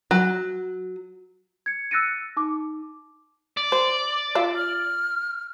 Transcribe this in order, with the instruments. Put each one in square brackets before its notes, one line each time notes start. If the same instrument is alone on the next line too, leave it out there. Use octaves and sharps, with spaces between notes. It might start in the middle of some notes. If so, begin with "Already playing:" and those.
[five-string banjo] F#3
[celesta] G#6 C#7
E6 F#6 A6 A#6 C#7 D#7
D#4 D6
[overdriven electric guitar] D5
[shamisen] C5
F4 E5
[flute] F6